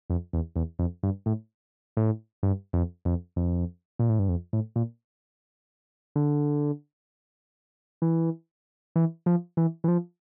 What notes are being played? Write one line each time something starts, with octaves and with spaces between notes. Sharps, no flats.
F2
E2
E2
F2
G2
A2
A2
G2
F2
F2
F2
A#2
A2
G2
F2
A2
A#2
D3
E3
E3
F3
E3
E3
F3